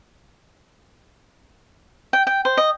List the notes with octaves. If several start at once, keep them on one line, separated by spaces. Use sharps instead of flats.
G5
G5
C5
D#5